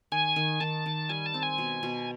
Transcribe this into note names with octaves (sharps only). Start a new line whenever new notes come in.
D#3 G#5
D#3
D#3 A5
D#3
G3 G#5
A5
C4
G#5
B2
B2